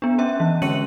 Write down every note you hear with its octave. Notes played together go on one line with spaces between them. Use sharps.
B3 D4
C#4 E5
E3
D3 G#3 C#4 C#7 D#7 F#7